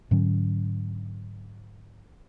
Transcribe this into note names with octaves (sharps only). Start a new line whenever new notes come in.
G#2 D3 F#3 C#4